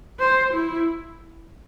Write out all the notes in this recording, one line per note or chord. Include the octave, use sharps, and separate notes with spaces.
C5
E4